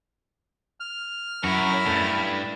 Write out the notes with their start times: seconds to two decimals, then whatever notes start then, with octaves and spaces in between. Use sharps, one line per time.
0.80 F6
1.44 F#2 E4 A#4 C#5
1.86 E2 G2 A3